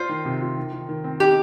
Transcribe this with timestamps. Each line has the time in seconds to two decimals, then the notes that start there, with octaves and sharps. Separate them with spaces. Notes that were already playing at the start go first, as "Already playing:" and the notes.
Already playing: F4 C5
0.09 D#3
0.25 C3
0.41 F4
0.57 D#3
0.73 D#3
0.89 D#3
1.04 C4
1.20 D#4 G4